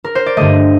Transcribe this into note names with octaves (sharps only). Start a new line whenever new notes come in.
A#4
C5
D5
G2 D3 A3 D#5